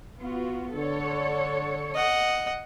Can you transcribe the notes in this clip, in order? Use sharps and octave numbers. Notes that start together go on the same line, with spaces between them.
B3 F4 F#4
D3 A4 C#5
D#5 F#5